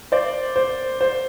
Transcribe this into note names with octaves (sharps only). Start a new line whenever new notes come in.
C5 D5
C5
C5